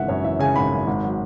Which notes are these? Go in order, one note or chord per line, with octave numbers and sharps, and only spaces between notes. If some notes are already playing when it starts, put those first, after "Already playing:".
Already playing: G#1 C#3 E3 E5 F#5
F#2 C#5
E3 E5
C#3 G#5
G#1 B5
F#2
G#1
F#3